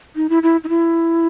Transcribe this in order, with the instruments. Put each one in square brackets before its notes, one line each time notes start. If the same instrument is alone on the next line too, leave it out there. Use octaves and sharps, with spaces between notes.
[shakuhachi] D#4
E4
E4
D#4
E4